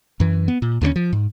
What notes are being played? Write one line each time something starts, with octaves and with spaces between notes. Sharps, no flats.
F#2 E3
B3
A#2
D#2 D3 A3 C#4
F3
G#2